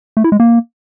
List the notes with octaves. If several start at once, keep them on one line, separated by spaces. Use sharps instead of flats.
A3
E4
G#3
A#3